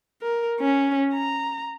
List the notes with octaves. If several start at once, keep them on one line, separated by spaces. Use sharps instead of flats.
A#4
C#4
A#5